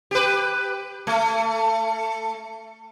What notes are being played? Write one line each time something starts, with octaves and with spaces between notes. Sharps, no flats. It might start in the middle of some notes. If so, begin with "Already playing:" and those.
G4 B4
A3